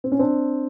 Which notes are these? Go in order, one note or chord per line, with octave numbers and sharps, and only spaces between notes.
C4
C#4
C4 D4